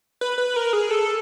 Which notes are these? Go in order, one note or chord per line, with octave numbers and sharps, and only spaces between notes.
B4
B4
A#4
G#4
A4